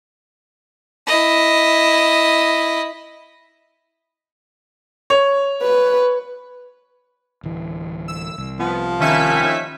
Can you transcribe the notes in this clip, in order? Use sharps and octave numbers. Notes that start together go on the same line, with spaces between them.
E4 D#5
C#5
B4
D1 E3
E6
C2
F3 B3
D#2 A2 D#3 C#4 E5 B6